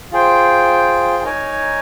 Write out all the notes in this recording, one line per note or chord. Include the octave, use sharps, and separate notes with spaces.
F4 G#4 C5 G5
D#4 A#4 C#5 G#5